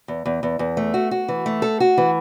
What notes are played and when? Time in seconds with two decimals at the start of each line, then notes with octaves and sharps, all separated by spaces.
0.08 E2
0.26 E2
0.43 E2
0.59 E2
0.77 A3
0.94 F#4
1.11 F#4
1.28 E3
1.46 A3
1.62 A4
1.80 F#4
1.98 E3